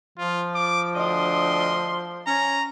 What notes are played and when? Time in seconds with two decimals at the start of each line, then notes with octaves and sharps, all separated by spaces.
0.18 F3 F4
0.55 D6
0.95 D2 D4 D#5 C6
2.27 C#4 A#5